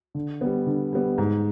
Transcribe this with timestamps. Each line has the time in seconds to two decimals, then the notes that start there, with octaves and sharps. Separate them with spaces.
0.15 D3
0.41 G3 B3
0.67 D3
0.93 G3 B3
1.18 G#2